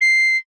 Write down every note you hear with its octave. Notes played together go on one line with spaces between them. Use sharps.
C7